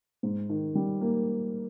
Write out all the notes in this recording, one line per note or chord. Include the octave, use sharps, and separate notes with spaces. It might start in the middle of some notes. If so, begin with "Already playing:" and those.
G#2
D#3
G3
A#3